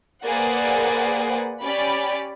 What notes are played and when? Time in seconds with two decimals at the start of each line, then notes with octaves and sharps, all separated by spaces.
0.24 A#3 G#4 B4 C5 D5 F#5
1.62 C#4 G4 D5 B5